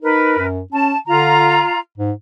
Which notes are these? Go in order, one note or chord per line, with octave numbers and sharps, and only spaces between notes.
D#4 A#4 B4
F#2
C#4 A5
D3 F4 A#5
G#2